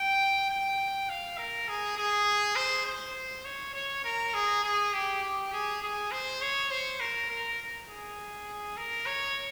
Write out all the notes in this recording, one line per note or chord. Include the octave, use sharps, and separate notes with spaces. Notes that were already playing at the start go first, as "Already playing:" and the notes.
Already playing: G5
G5
F5
A#4
G#4
G#4
C5
C5
C#5
C#5
A#4
G#4
G#4
G4
G4
G#4
G#4
C5
C#5
C5
A#4
A#4
G#4
A#4
C#5